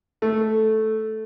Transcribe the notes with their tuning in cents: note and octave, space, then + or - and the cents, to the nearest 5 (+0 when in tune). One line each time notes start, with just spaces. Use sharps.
A3 -5